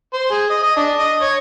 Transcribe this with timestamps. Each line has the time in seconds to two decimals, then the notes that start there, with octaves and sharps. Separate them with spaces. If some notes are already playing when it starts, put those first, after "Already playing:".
0.14 C5
0.31 G#4
0.50 D#5
0.63 D#5
0.76 D4
0.98 D#5
1.22 C#5